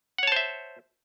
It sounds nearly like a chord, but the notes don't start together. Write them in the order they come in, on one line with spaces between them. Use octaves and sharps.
F#5 C#5 A5 C5 E5